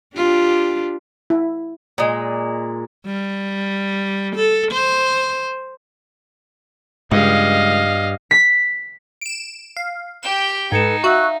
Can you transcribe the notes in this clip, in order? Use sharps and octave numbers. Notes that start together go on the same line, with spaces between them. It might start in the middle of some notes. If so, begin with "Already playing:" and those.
D4 F4 G4
E4
A#2 G#3
G3
A4
C5
C#2 G2 D#5 F5
B6
D7 E7
F5
G4 G5 E7
G#2 D#4 A4 B4 G#6 C#7 E7
F#4 E5 F5 C#6 E6 F#6